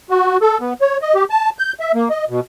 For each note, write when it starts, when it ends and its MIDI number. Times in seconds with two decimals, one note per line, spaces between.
0.10 0.38 66
0.41 0.58 69
0.61 0.73 59
0.81 0.98 73
1.02 1.14 75
1.15 1.24 67
1.30 1.50 81
1.59 1.73 91
1.80 1.92 76
1.95 2.09 58
2.10 2.25 75
2.29 2.40 47